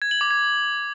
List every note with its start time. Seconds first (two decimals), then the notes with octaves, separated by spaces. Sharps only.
0.02 G#6
0.11 F#7
0.21 D6
0.31 G#6